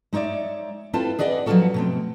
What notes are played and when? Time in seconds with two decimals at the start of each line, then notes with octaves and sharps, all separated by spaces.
0.13 G#3 D#4 C#5 D5 E5
0.93 C4 E4 F4 A4 B4 A5
1.19 G#4 B4 D5 D#5 F#5
1.46 F3 F#3 A3 C#4 A4 C#5
1.74 B2 A3 C4